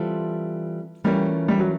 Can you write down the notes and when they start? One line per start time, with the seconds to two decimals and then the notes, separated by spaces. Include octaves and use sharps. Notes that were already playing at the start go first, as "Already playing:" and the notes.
Already playing: E3 G3 C4 F4 A4
1.04 E3 G3 A3 C#4 F4 A#4
1.48 G3
1.59 F#3